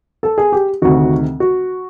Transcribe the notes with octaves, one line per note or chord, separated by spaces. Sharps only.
A4
G#4
G4
D2 C3 D#3 F#4
F#4